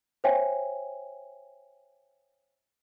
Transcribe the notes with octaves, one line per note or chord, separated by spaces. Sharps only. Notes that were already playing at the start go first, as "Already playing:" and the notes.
C5 C#5 E5 G5 G#5